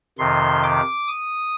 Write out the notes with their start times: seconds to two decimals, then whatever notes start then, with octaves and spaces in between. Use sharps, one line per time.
0.19 F2 C3 D#3 C6
0.63 D6
1.08 D#6